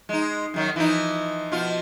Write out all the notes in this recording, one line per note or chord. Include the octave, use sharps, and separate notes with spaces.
G#3 D#4
F#2 D#3 F#3
E3 F3 D#4
B2 F3 F4